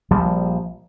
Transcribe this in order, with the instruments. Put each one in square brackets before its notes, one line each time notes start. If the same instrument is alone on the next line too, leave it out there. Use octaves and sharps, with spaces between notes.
[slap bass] A#1 F3 G3